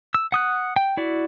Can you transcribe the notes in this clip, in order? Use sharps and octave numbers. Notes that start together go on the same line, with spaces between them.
E6
F#5 D#6 F#6
G5
E4 F#4 D5